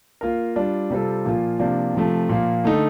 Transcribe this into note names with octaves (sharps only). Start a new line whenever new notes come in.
A#3 F4 A#4
G3 D4 F4
C3 G3 C4 F4 A4
A#2 F3 A#3 F4
C3 F3 A#3 D4
C3 F3 A3
A#2 F3 A#3
D3 A3 D#4 A4